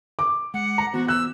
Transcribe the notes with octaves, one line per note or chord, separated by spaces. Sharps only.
D6
G#3 F#5
A#5
E3 B3 F#4 C5
E6 F#6